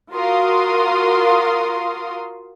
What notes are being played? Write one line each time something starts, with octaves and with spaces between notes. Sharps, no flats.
F4 F#4 A#4 F5 C6 D#6